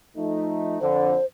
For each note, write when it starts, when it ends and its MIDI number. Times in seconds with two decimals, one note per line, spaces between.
0.17 0.76 53
0.17 0.76 57
0.17 0.76 63
0.81 1.14 41
0.81 1.14 50
0.81 1.25 72